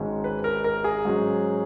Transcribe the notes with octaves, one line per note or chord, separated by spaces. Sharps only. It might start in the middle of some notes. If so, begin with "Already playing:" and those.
Already playing: G#1 G#2 D#3 G#3 C#4
B4
A#4
A#4
G#4
G#2 F#3 C#4